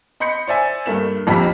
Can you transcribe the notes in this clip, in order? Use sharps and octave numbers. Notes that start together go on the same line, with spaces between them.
D#5 B5 C6 G6 C#7
C5 D5 E5 G#5
G2 A3 A#3 E7
A#1 F2 E4 G4 B5 B6